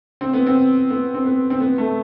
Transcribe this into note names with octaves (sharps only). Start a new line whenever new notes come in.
C4
B3
C4
B3
C4
B3
C4
B3
A3